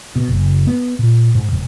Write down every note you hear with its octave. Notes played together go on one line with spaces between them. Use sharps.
B2
F#1
B3
A#2
G#2
E1